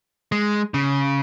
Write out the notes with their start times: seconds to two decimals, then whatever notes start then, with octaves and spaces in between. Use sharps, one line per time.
0.32 G#3
0.74 C#3